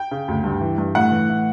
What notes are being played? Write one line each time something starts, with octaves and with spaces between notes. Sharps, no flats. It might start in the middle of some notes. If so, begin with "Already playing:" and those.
Already playing: G5
C#3
D2
G2
E3
G2
A2 F#5
E3
A2